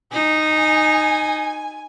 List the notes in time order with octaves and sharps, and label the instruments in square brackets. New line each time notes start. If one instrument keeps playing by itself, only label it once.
[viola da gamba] D#4 [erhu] G#5